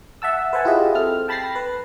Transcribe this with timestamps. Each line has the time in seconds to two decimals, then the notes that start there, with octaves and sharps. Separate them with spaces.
0.22 E5 F#5 A5 E6
0.53 B4 C5 E5 F#5 G#5 A5
0.65 E4 F4 G4 G#4 D#5 E5
0.95 C4 A4 F6
1.28 G5 A5 B5 A6 A#6 C7
1.55 B4